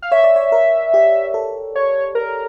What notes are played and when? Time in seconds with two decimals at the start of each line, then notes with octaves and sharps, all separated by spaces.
0.02 F5
0.12 C#5 E5
0.24 D5
0.36 C#5
0.52 A#4
0.94 G4
1.34 A4
1.75 C#5
2.15 A#4